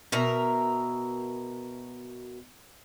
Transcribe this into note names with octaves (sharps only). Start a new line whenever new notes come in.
B2 A#4 E5 A#5